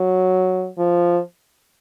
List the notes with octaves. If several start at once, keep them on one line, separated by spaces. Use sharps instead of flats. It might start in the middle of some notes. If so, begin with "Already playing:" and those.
Already playing: F#3
F3